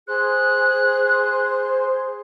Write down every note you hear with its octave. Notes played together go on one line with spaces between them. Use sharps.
G#4 C5 F#6